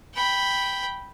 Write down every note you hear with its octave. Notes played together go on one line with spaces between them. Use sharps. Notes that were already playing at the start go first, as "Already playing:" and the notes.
G5 B5